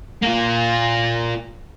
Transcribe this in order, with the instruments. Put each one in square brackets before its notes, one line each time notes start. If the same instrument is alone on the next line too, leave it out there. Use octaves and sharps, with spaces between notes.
[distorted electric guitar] A#3 F4